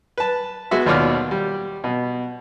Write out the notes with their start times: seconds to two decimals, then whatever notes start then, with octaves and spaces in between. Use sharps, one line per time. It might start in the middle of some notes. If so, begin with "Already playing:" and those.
0.18 B4 A5
0.71 G#3 B3 F#4 E5
0.86 D#2 B2 F4 C#5 D5 F6
1.31 G3
1.84 B2